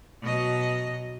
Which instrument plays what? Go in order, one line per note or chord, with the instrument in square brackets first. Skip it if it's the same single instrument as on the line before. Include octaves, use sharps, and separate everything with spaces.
[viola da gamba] B2 F#3 D#5